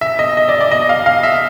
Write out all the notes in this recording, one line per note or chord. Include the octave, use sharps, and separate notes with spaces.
E5
D#5
D#5
D5
D5
D#5
F5
F5
E5